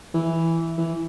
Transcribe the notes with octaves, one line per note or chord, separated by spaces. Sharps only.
E3
E3